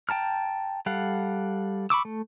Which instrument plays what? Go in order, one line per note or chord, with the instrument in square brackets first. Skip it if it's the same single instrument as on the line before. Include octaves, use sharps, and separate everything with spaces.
[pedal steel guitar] G5 A5 A#5 F6
G3 A4 F5 F#5
B5 C#6 D6 E6
A3